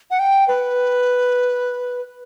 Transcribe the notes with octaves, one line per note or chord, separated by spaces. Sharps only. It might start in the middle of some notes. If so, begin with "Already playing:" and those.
F#5
G5
B4